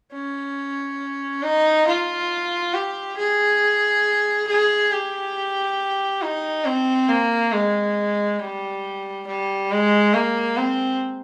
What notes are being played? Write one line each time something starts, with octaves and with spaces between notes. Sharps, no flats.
C#4
D#4
F4
G4
G#4
G#4
G4
D#4
C4
A#3
G#3
G3
G3
G#3
A#3
C4